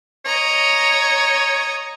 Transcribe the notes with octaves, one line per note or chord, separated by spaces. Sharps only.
C#5 D#5 A#5